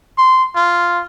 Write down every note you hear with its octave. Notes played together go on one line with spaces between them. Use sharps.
C6
F4